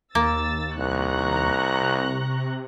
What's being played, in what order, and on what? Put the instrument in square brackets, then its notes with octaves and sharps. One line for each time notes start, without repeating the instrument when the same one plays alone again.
[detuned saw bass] D#2 [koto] A#3 [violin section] E6 A6
[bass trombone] C2 [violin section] A#5 C#6 F#6
[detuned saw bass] C3